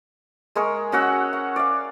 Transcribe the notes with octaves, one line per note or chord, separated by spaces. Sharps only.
G#3 G#4 A#4 C#6
C#4 F#4 F#5 E6
F#5
D5 F5